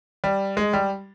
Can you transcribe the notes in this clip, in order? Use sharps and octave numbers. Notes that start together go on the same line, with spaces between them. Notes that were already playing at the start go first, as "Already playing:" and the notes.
G3
G#3
G3